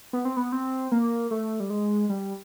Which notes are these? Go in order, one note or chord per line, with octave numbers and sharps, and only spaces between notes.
B3
C4
B3
C4
A#3
A3
G3
G#3
G3